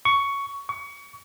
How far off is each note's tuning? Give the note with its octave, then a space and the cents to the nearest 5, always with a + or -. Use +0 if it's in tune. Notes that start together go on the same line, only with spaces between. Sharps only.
C#6 +10
C#6 +30